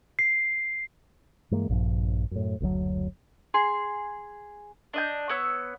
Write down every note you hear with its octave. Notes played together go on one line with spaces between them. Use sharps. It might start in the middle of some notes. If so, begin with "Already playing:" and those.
C7
G2 E3 G#3 A#3
A#1 G2 F3
F#2 A2
F#1 D2 A2 F#3
G#4 C6
D4 D#5 G6
B3 C#5 E6